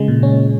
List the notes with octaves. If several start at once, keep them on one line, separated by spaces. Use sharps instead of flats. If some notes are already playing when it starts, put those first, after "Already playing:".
Already playing: C#3 G#3
A#2
C#4